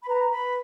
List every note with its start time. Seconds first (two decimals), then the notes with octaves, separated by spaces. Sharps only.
0.02 B5
0.07 B4 A#5
0.30 B4 B5